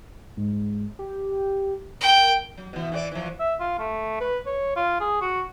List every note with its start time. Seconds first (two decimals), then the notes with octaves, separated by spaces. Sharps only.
0.37 G#2
0.99 G4
2.01 A#4 G5
2.58 F#3
2.73 B2 E3
2.92 E3 F#4 D5
3.12 E3 F3
3.40 E5
3.60 F4
3.79 A3
4.20 B4
4.46 C#5
4.76 F4
5.01 G#4
5.21 F#4